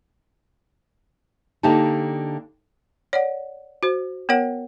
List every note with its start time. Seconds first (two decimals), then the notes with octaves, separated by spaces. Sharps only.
1.63 D3 A#3 D#4 G4 A5
3.13 C#5 D5 F#5
3.83 F#4 C5
4.29 B3 A#4 C#5 F#5